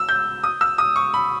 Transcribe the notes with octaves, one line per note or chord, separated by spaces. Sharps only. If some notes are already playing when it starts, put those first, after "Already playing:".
Already playing: E6
G6
D#6
E6
D#6
C#6
B5